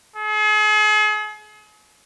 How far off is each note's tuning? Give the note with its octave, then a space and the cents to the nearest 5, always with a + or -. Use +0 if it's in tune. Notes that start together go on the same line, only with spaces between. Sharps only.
G#4 +40